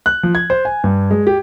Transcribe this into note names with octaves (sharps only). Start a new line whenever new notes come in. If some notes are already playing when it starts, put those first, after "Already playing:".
F#6
F3
G#6
C5
G#5
G2
G#3
G4